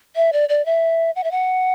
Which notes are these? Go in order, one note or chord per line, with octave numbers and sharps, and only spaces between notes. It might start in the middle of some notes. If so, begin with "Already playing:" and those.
E5
D5
D5
E5
F#5
E5
F#5